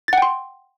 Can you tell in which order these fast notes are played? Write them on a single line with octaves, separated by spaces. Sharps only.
A6 F#5 G5 C6